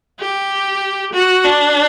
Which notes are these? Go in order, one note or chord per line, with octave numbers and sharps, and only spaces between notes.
G4
F#4
D4